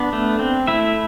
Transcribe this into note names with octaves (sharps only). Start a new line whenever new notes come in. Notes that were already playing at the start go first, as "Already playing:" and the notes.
Already playing: B3 D4 D5
A3
C4
A3 E4 E5